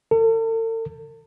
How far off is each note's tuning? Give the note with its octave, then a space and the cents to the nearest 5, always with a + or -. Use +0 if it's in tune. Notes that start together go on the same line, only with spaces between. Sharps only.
A4 +45